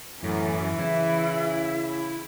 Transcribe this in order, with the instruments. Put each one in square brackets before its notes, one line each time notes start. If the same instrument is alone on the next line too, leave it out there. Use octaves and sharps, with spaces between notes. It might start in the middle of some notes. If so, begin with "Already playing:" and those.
[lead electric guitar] F#2 [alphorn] A2 [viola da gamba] E3
[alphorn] C#3 [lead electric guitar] E4